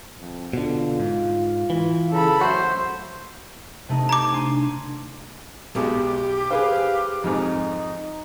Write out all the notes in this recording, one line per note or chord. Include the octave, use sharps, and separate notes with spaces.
F2
B2 D3 F4
G#2
E3
C#3 A4 B5
F#3 A3 F#4 C5
C3 A3 D#4
A#5 D6 G#6 D7
D4 G#5 C6
B1 B2 G#3 G4
G#4 B4 C5 F5
F2 G#2 D#4